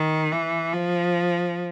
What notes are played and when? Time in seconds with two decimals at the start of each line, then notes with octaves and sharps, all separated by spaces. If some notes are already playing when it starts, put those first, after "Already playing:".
Already playing: D#3
0.32 E3
0.74 F3